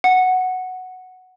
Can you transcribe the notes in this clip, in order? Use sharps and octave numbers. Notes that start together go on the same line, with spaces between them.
F#5